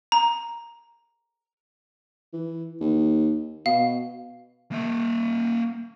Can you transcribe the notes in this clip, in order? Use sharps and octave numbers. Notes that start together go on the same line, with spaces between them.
A#5
E3
D#2
B2 F5
A#3 E5